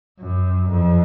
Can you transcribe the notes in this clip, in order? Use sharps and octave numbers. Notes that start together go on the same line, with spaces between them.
F#2
F2